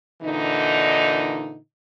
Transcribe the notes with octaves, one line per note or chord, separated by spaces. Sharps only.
A#2 D3 E3 D#4